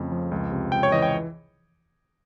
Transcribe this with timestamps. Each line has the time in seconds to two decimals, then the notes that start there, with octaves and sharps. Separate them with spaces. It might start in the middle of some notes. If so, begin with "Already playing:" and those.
Already playing: F2 C#3 A3
0.12 F3
0.31 C#2
0.52 C3
0.72 C#2 G5
0.83 C#5
0.92 E3 D#5
1.02 G5